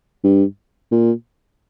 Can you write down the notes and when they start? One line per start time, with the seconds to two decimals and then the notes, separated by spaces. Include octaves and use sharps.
0.24 G2
0.91 A#2